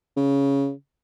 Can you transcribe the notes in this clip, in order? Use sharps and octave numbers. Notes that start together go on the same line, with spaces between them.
C#3